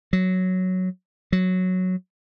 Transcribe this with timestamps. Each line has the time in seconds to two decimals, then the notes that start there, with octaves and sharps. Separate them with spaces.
0.13 F#3
1.32 F#3